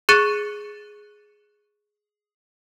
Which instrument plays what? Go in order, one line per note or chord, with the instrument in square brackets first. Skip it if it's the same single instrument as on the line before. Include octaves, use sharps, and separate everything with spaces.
[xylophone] G#4 C#6 F#6 A6 C#7 D#7